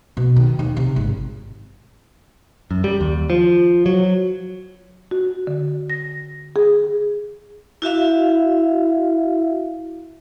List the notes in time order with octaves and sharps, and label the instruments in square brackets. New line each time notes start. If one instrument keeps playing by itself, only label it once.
[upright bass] B2
D#3
D#2
C3
G#1
[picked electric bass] F#2
G3
D#2
F3
F#3
[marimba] F#4
D3
A#6
G#4
[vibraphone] E4 F#4 E5 F5